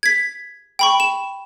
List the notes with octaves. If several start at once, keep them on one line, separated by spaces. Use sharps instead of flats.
G#6 B6
G5 B5 C#6
E7